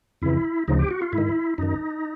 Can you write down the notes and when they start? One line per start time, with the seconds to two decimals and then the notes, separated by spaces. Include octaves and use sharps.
0.22 F2 C#3 E3 E4
0.68 D2 C#3 F3 D#4
0.79 G4
0.90 F#4
1.02 F4
1.13 G#2 E4
1.18 D#3
1.58 F#2 D#3 D#4